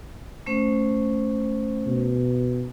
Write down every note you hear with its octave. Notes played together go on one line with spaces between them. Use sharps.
A3 C#4 C5
B2